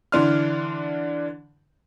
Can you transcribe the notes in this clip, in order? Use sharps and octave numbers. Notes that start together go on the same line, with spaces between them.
D3 E3 D4 C6 F6